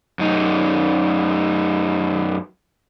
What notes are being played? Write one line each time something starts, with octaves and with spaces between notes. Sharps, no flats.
F#2 D#4